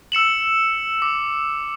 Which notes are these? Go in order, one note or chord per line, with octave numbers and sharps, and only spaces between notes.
E6 C#7 E7 F#7
D6